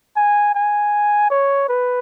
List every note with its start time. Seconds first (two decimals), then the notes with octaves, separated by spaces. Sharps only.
0.17 G#5
0.55 G#5
1.30 C#5
1.69 B4